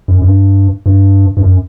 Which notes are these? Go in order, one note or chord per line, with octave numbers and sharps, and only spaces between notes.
F#2
F#2
G2
G2
G2
F#2